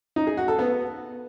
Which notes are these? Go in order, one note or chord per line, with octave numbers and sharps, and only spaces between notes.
D#4
G#4
F#4
A4
B3